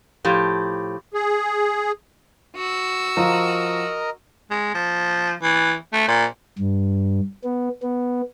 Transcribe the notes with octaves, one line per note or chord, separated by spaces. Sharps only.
A2 F3 G4
G#4
F#4 E6
F3 A#4 D#5 A#5
G#3
F3
E3
A3
A#2
G2
B3
B3